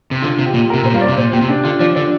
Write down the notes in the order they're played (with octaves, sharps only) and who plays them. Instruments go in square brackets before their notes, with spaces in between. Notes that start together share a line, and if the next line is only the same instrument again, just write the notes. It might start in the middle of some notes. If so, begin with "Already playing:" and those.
[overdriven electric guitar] C3
[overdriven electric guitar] D3 [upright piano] F4
[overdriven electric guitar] C3
[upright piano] G4
[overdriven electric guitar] A#2
[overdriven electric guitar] C3 [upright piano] A#4
[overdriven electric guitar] A#2 [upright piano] C5
[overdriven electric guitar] G2 [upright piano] F5
[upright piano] D5
[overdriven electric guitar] C3
[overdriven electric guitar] A#2 [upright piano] C5
[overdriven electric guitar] A#2 [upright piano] G4
[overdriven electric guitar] C3
[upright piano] D4
[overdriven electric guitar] D3 [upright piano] F4
[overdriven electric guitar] F3 [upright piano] D5
[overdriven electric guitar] D3 [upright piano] D5